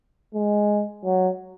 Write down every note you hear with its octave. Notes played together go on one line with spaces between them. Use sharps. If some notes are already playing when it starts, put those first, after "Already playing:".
G#3
F#3